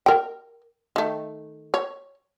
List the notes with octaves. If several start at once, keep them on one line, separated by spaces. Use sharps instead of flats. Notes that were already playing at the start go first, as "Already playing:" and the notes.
A#4 G5
D#3 A3
C#5